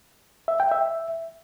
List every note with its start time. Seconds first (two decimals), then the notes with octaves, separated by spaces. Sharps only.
0.48 E5
0.60 G5
0.71 E5